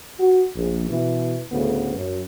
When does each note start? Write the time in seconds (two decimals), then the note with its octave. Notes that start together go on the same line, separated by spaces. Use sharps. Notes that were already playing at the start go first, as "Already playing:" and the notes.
0.20 F#4
0.56 A#1
0.90 B2 E3
1.50 D2 A2 C#3 B3
1.95 F#2